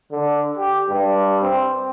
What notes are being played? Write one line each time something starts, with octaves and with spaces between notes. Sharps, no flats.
D3
G4
G2
C4